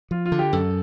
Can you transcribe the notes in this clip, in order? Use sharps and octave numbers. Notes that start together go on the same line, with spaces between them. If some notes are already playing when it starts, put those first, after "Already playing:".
F3 F4
F4
D3
G4
F#2 A4